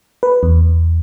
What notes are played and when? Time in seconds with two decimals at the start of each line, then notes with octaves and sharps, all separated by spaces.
0.23 B4
0.43 E2